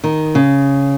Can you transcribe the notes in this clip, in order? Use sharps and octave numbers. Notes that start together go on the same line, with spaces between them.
D#3
C#3